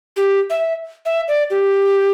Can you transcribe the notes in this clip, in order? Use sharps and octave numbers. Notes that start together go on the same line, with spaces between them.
G4
E5
E5
D5
G4